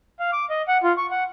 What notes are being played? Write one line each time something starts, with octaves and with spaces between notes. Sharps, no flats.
F5
D6
D#5
F#5
F4
C#6
F#5